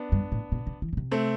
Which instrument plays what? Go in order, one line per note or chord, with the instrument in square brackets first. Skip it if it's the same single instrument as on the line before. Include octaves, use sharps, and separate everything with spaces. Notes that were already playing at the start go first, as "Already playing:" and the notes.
Already playing: [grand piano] B3 D4
[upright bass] G2
A2
B2
C3
E3
B2
C3
[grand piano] A3 C4